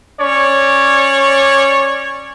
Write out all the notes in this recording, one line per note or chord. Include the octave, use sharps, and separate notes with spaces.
C#4 C#5 D5